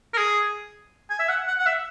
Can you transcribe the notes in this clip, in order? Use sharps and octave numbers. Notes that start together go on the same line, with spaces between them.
A#4
G#4
G#5
E5
F#5
F#5
F#5
E5